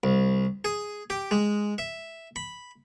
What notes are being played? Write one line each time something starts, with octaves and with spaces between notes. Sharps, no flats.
C2
G#4
G4
G#3
E5
B5